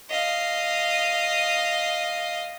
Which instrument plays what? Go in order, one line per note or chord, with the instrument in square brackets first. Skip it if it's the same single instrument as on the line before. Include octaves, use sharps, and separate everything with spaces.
[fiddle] D#5 F5